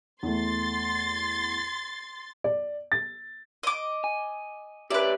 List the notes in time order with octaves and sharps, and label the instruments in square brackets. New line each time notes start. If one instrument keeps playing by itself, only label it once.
[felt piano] E2 A3 [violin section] C6 A6
[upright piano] D5
A6
[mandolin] D#5 D6
[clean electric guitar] G#5
[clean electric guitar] G4 C#5 E5 [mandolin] B4 D5